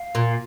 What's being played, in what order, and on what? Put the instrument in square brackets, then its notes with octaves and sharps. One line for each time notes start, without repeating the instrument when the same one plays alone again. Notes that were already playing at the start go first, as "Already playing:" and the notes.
Already playing: [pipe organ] F5
[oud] A#2